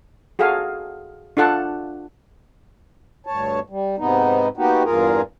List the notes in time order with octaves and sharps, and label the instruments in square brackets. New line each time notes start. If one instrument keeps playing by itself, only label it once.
[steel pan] F#4 G#4 A4 F5 G#5
D4 F4 A4 F#5 A5
[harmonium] D2 G2 C#5 A5
G3
G#2 C3 B3 D#4
A#3 B3 D#4 F#4 G4
E2 G2 A#3 F4 G#4 A#4